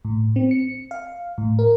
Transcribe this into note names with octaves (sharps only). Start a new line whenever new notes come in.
A2
C4
C#7
F5
A2
A#4